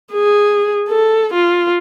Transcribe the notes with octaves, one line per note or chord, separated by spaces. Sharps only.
G#4
A4
F4